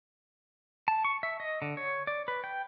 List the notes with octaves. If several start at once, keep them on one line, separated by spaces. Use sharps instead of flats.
A5
C#6
E5
D#5
D3
C#5
D5
B4
G5